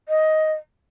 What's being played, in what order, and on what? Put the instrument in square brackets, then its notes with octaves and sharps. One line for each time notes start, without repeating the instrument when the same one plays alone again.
[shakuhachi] D#5